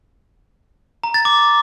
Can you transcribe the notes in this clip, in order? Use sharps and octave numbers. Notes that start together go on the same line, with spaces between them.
A#5
A6
D6